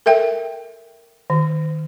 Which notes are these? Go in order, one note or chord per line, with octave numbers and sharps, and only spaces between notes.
A4 A#4 E5 G5
D#3